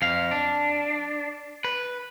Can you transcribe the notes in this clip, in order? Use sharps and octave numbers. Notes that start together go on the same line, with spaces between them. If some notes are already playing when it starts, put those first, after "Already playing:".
F2 F5
D4
B4